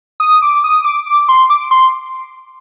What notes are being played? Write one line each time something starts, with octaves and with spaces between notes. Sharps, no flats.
D#6
D6
D#6
D6
D6
C6
D6
C6